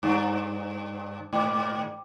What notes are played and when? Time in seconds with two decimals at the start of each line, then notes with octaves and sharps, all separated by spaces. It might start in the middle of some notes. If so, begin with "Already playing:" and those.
0.03 G2
1.33 G#2